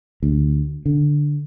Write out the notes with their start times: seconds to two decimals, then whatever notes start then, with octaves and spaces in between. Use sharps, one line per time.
0.23 D2
0.86 D3